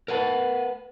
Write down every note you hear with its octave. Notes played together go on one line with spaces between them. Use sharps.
A#4 B4 F#5 A5